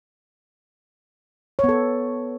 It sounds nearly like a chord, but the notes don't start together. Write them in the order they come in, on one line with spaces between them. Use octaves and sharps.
C#5 B3 A4